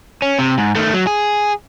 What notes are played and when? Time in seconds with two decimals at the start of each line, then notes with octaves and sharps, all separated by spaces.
0.22 C#4
0.39 C3
0.58 G#2
0.76 D#3 A3
0.93 F#3
1.07 G#4